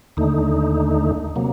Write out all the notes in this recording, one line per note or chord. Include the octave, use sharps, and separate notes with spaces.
D#2 D3 A3 D#4
C3 F#3 A#3